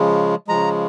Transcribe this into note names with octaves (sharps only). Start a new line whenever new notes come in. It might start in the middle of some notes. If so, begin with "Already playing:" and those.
Already playing: C#3 F3 G#3
C#3 F3 G#3 A#5